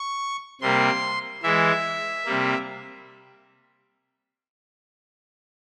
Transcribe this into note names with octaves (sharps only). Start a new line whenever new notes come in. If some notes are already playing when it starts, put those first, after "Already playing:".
Already playing: C#6
C3 G3 A#3 C6
E3 G#3 E5
C3 G3 A#3